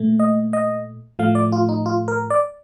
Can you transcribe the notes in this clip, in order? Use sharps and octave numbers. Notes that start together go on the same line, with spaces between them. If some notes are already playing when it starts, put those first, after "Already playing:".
Already playing: A#2 A3
D#5
D#5
A2 F3 A3 F5
D5
F4
D#4
F4
A#4
D5